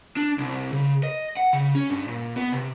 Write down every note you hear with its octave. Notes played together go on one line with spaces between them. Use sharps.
D4
C2
C#3
D#5
F#5
C#3
C#4
G2
A#2
B3
C3